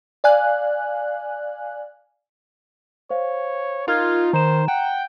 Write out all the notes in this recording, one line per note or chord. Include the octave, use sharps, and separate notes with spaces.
D5 F5 G#5 F#6
C5 C#5 F5
D#4 F4 A#4 F6 G#6
D#3 C5 A#5 E7
F#5 G5